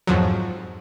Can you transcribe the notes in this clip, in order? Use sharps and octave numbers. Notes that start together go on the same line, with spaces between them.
F2 G#2 F3 F#3